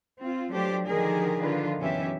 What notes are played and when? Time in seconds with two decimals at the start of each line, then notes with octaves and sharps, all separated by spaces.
0.20 C4 F4
0.49 F3 F#3 A3 D4 G4 C5
0.86 D3 D#3 F3 G4 G#4 A#4
1.38 D3 D#3 F3 F4 B4
1.79 F#2 B2 E3 C#4 G4 E5